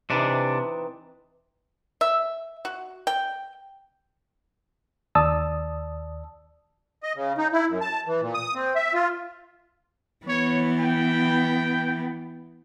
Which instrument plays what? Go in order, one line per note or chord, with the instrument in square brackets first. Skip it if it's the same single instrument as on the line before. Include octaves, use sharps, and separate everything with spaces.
[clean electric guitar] C3 D4 [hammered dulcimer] E3 C4 D#4
[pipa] E5
F#4
G5
[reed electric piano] D#2 D5 A5 D#6 E6
[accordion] D#5
C#3
D#4
E4
F#2
A5
E3
A#2
D#6
C4
E5
F4
[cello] E3 B3 [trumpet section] C#5
[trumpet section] G5